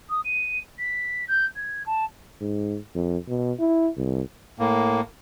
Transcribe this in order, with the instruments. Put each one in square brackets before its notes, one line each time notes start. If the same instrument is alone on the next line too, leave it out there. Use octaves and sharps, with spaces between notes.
[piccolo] D#6
D#7
B6
G6
G#6
A5
[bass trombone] G#2
F2
B2
E4
C2
[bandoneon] A2 A#3